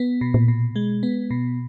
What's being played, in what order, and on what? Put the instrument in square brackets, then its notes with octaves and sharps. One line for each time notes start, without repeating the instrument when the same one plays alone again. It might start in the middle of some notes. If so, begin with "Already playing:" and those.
Already playing: [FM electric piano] B3
B2
[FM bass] A#2
[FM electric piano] B2
G#3
B3
B2